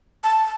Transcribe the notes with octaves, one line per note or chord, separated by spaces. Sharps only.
A5